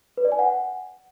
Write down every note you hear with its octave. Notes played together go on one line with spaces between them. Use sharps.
B4
D5
G#5
F#5